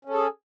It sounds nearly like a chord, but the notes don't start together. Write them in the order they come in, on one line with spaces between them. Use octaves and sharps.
C#4 A4 G#4